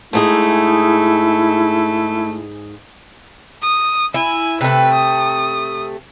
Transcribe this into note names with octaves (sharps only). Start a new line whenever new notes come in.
G#2 A3 D#4 E4 G#4
D#6
E4 G#5
C3 A3 B4
D#6